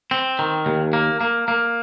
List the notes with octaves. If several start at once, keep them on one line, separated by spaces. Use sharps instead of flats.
C4
D#3
D#2
A#3
A#3
A#3